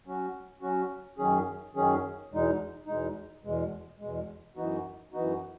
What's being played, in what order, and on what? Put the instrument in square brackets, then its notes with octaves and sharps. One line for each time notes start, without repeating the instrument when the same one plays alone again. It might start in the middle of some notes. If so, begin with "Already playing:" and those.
[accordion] F#3 C#4 F#4
F#3 C#4 F#4
F#2 D#3 F#3 C#4 G#4
F#2 D#3 F#3 C#4 G#4
E2 B2 G#3 D#4
E2 B2 G#3 D#4
E2 B2 G#3
E2 B2 G#3
F#2 E3 B3 D#4 F#4
F#2 E3 B3 D#4 F#4